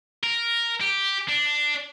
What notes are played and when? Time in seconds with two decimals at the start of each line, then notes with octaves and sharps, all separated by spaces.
0.24 A#4
0.81 G4
1.28 D4